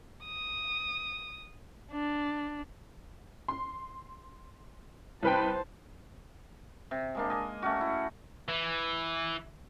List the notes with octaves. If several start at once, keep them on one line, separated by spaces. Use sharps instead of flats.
D#6
D4
C6
C2 B4 C5 G5 A5
C3
G#3 A#3 D4
D#5 G#5
A3 C#4 F#4
E4
E3